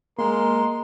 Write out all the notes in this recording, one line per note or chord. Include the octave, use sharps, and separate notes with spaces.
G#3 A#3 A#4 C6